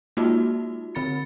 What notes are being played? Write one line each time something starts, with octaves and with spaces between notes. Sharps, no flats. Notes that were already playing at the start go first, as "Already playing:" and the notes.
G#3 A#3 D#4 F4 F#4
D3 C4 B5 A6 C#7